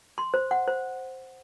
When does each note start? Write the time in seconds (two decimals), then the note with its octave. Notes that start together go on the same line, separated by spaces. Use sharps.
0.18 C6
0.34 C5
0.51 F#5
0.68 C5